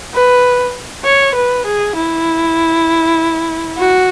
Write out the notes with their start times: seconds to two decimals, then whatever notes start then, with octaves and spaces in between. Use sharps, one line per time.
0.14 B4
1.05 C#5
1.35 B4
1.66 G#4
1.95 E4
3.78 F#4